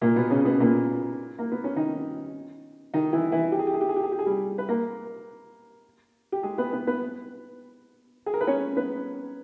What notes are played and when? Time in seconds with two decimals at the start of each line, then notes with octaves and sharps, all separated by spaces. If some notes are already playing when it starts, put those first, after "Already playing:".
0.01 A#2 A#3
0.16 B2 B3
0.30 C#3 C#4
0.45 B2 B3
0.60 A#2 A#3
1.39 A#3
1.52 B3
1.64 C#4
1.76 D#3 D#4
2.94 D#3 D#4
3.12 E3 E4
3.32 E3 E4
3.52 G4
3.59 G#4
3.67 G4
3.74 G#4
3.81 G4
3.89 G#4
3.96 G4
4.03 G#4
4.12 G4
4.19 G#4
4.26 G3 G4
4.58 B4
4.69 A#3 A#4
6.32 G4
6.43 G#3 G#4
6.58 B3 B4
6.73 B3 B4
6.87 B3 B4
8.26 G#4
8.34 A#4
8.41 B4
8.47 C#4 C#5
8.76 B3 B4